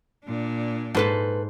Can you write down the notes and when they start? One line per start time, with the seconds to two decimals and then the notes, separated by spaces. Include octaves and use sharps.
0.25 A#2 D4
0.95 G#2 A4 B4 C5 A5